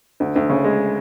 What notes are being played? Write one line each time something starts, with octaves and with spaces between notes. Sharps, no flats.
D2
D2
C#3
G#3